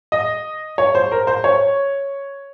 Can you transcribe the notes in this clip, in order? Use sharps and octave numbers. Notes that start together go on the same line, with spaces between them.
D#5
C#5
C5
A#4
C5
C#5